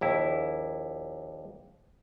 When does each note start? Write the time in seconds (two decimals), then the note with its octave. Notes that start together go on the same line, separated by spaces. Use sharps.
0.01 A#1 D#2 E4